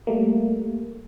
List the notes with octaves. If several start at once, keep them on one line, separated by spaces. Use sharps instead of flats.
G3 A3 A#3